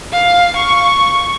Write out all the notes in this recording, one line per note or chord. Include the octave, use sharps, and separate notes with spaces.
F5
C#6